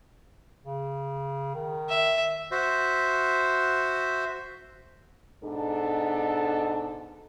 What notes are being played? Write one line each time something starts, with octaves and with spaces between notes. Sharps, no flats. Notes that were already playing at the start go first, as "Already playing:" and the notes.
C#3
D#3
E5
F#4 C5 E5
G#2 B2 D4 A4